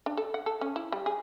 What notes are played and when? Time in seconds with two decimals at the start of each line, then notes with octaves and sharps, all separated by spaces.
0.06 D4
0.17 A4
0.34 F#5
0.46 A4
0.61 C#4
0.76 E4
0.92 G3
1.06 G#4